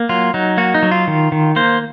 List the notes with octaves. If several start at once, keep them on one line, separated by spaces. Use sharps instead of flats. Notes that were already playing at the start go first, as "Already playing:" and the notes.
Already playing: A#3
F#3 F4
F#3 D#4
A#3 F#4
D#4
F#3
F4
D#3
D#3
A#3 C5